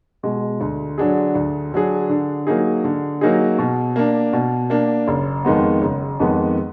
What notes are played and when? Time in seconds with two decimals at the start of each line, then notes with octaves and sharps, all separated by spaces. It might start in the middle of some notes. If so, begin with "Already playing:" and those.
0.23 B2 G#3
0.61 D2
0.98 D3 F#3 D4 G#4
1.35 D2
1.72 D3 F#3 D4 G#4
2.10 D3
2.47 F#3 A#3 D#4 G#4
2.84 D3
3.21 F#3 A#3 D#4 G#4
3.58 B2
3.96 A#3 D4
4.33 B2
4.70 A#3 D4
5.08 F#1
5.45 F2 D#3 G#3 B3
5.82 F#1
6.20 F2 D#3 G#3 B3